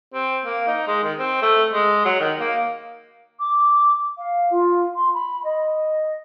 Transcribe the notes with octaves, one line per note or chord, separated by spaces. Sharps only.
C4
A#3
D#4
G#3
D#3
C4
A3
G#3
F#3
D#3
A#3
D6
F5
F4
C6
B5
D#5